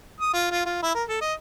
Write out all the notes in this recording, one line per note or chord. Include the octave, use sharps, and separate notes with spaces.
D#6
F4
F4
F4
E4
A#4
A4
D#5